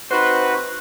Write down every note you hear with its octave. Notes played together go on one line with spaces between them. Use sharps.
C4 D#4 F#4 B4 C5